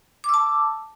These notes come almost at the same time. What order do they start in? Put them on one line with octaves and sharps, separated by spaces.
D6 E6 A5